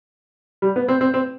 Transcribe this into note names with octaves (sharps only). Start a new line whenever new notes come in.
G3
B3
C4
C4
C4